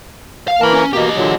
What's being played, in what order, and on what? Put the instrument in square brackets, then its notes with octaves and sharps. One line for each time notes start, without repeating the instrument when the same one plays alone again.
[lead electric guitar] F5
[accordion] E3 A#3 A#4 [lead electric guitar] A5 B5
[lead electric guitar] C#4
[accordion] B2 A#3 [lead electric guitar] G4 D#5
[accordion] A#2 D3 F#3